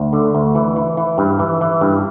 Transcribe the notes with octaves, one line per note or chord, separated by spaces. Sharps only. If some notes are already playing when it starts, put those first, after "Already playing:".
Already playing: D2
D3
D2
E3
E3
E3
G2
E3
E3
G2